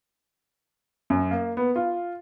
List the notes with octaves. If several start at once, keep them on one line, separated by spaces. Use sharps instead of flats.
F#2
A#3
B3
F4